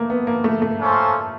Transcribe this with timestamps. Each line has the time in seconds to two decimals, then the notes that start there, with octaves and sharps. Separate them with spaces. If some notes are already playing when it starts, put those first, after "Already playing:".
Already playing: A3 A#3
0.10 B3
0.27 A#3
0.44 A3
0.62 A3
0.80 A#3 C#4 F4 A4 C5